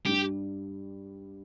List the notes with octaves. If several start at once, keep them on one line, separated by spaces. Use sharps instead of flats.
G2 G3 D4 G4